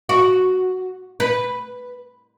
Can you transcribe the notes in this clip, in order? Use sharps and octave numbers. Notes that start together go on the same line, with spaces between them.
F#4
B4